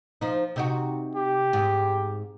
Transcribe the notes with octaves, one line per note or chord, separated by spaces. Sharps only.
F3 D#4
C3 D#4 F#4
G4
G#2